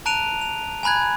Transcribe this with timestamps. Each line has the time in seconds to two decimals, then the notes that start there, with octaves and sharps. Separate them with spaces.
0.06 A5 A#5 F#6 D7 D#7 F7
0.41 F7
0.83 G#5 A#5 B5 F#6 G#6